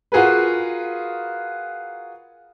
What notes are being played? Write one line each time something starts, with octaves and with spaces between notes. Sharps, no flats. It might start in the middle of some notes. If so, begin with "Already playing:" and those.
F4 F#4 G#4 A#4 B4